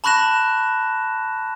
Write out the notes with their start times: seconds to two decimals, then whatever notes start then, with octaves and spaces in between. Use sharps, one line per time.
0.04 A5 B5 C#6 F#6 A#6 E7